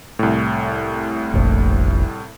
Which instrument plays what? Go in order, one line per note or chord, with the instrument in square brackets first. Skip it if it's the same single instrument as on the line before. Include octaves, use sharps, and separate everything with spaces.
[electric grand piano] C2 A2
[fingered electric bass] F1 A#1